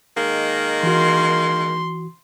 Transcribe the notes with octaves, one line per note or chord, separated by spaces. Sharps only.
D#3 G#3 A#3
E3 F#4 C6